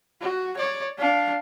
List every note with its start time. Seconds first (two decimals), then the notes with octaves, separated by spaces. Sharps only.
0.21 F#4
0.57 C#5 D5
0.98 D4 F5